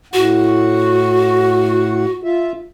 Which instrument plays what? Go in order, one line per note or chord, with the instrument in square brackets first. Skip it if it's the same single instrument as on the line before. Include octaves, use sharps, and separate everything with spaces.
[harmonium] A2 F#5 [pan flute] F#4
[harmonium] F4 E5